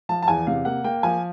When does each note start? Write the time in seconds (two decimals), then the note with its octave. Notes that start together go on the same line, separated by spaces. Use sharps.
0.09 F3 A5
0.23 A5
0.28 E2 G#5
0.47 C3 F5
0.65 A#3 F#5
0.84 A#3 G5
1.03 F3 G#5